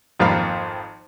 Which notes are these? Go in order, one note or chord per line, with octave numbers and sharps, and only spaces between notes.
G#1 F2 A#3 F5 B5